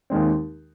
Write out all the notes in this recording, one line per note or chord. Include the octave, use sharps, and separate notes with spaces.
D#2 D#3 G#3 C4